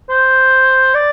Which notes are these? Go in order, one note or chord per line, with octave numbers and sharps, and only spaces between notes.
C5
D5